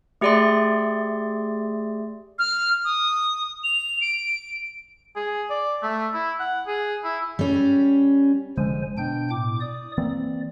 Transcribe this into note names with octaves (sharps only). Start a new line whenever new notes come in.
A3 G4 G#4 D5 E5 C6
F6
D#6
F7
D7
G#4
D5
A3
E4
F#5
G#4
E4
G3 C#4
F1 D3 F3 G#3 C5 G#5
B2 D4 G5 G6
A2 D6
D5 D#6
E3 A#3 C4 D5